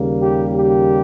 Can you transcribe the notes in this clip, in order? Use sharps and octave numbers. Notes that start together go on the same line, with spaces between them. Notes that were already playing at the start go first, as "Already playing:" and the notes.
Already playing: D#2 C#3 G3 A#3
G4
G4